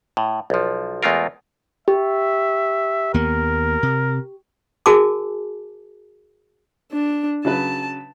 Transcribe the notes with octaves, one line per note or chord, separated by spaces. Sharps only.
A2
B1 F3
E2 G#3 A3 F4 A#4
G4 E5
D#2 A#3 B3 A#4
C3
F#4 G#4 A#4 G#5 A5 D6
D4
C#3 F#3 B4 A5